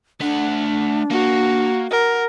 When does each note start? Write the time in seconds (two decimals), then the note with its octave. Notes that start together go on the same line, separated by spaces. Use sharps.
0.21 A3 D4 F#5
1.11 A#3 F#4
1.91 A#4 F#5